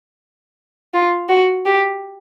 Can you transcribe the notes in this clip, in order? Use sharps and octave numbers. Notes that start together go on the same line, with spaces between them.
F4
F#4
G4